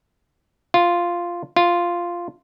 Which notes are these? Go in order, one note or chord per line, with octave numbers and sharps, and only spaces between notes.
F4
F4